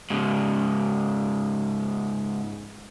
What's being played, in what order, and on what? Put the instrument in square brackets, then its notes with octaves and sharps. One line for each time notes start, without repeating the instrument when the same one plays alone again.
[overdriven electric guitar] G#2 C#3